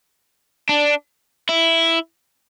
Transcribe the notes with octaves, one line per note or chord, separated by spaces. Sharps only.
D4
E4